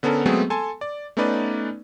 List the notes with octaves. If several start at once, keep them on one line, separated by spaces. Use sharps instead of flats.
D3 B3 C#4 A4 A#4
F#3 G#3 A3 B3 C4 G#4
A4 G#5 A5 C6
D5
A3 B3 C#4 D#4 B4 D5